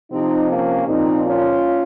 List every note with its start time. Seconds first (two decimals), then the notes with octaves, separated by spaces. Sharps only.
0.12 C3 F3 C4 D#4
0.50 A#3 C#4
0.87 A#2 F3 C4 D#4
1.25 C#4 F4